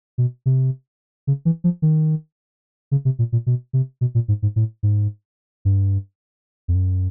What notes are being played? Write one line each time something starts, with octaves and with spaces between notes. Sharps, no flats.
B2
C3
C#3
E3
F3
D#3
C#3
C3
A#2
A#2
B2
C3
B2
A#2
G#2
G#2
A2
G#2
G2
F2
F#2